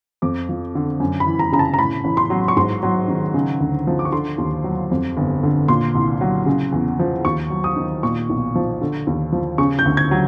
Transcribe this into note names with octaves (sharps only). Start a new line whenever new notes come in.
F2 D6
F3
D3
F#2
B5
E3
A#5
C#3 A#5
A5
A#5
A2 B5
A1
C6
F#3
C#6
G#2 C6
F#3
D#3
C#3
D2
F3
D6
C#6
D3 C6
D#2
F#3
F2
G1
D3
A#2 C6
C2
F#3
C#3
E2
F3
D#2 C#6
F#3
D#6
D#3
A#2 C#6
B1
F3
D3
D#2
F3
C#3 C#6
G6
D2
G#6
F#3